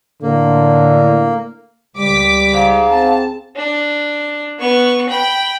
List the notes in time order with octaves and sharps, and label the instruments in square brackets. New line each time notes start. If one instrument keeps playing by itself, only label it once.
[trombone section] A2 D3 [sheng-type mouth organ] A#3
[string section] C#2 D6 B6 [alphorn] G3
[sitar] G#2 [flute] F5
[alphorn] C4 [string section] A5
[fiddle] D4
B3 C#6
G5 B5